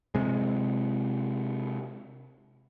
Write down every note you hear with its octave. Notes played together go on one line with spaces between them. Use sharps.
C3 G#3